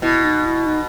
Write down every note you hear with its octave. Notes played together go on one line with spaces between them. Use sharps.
B2 E4
D#4
E4
D#4